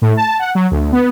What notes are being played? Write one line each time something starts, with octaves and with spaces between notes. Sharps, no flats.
A2
A5
F#5
F#3
D2
B3